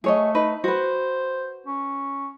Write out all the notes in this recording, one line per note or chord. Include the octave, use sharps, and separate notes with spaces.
A3 G#4 C#5 D#5
D#4 B4
F#4 B4 C5
C#4